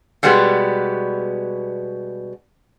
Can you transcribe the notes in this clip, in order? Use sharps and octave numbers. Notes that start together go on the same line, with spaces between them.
B2 G3 G#3 B3